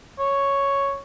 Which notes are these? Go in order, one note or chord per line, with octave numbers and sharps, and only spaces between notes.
C#5